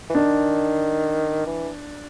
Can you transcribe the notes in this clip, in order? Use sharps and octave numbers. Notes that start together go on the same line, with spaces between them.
E3
D#3 D4
E3